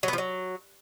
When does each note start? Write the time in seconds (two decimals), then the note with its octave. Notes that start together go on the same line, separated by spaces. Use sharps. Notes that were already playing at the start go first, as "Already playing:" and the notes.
0.03 F#3
0.08 B3
0.13 F3
0.18 F#3